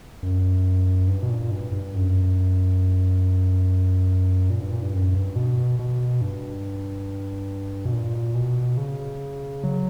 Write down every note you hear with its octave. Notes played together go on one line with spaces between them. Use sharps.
F#2
G2
B2
A#2
G2
G2
F#2
A#2
G2
A#2
G2
F#2
G2
B2
B2
G2
B2
A#2
B2
C#3
F#3